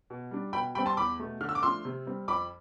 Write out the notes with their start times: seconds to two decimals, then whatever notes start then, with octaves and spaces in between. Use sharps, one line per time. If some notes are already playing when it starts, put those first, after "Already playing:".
0.10 B2
0.31 G3 D4
0.53 B2 G5 B5
0.75 G3 C4 G5 B5
0.86 A5 C6
0.97 E2 B5 D6
1.20 B2 A3
1.41 D3 F6
1.49 E6
1.55 D6
1.63 F3 A3 D4 C6 E6
1.85 C3
2.06 G3 C4
2.28 F2 B5 D6